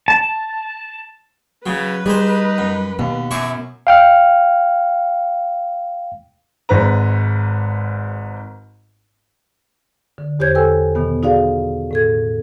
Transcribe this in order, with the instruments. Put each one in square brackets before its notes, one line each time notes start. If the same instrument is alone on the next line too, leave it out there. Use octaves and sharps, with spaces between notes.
[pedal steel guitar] A5
[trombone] C#3 [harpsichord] F#3 [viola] B4
[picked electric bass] G3 [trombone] D#4 [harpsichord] G#4 C5
[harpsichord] F#2
[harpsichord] D#2 [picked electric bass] B2
[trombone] F#2 [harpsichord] E4 C#6 D6
[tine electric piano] F5 G5 F6
[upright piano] G#1 G#2 B4 A#5
[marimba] D3
E2 G4 C5 C#5 G6 G#6
A4 B4 G5 G#5 E6
B2 D#3 B3
D#4 F#4 G#4 D5 F5
A2 A4 G#6